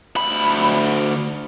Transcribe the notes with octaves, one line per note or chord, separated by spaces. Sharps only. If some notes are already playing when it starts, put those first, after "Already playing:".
D2 B5